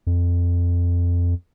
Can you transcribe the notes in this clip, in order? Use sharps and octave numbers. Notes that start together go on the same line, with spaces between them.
F2